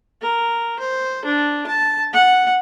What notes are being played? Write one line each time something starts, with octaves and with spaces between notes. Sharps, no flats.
A#4
C5
D4
A5
F#5